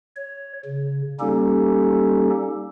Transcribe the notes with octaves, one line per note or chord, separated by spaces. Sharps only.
C#5
C#3
G3 A#3 C#4 D#4 G4 A4